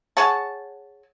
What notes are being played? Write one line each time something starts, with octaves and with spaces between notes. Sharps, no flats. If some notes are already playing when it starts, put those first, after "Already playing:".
G#4 C#5 F#5 A5